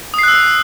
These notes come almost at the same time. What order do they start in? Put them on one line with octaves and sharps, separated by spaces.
D#6 C7 F#6 E6